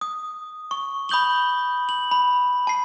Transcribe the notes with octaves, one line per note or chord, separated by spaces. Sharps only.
D#6
C#6
B5 D#6 G6 F#7 G7
F#7
B5
A5 C7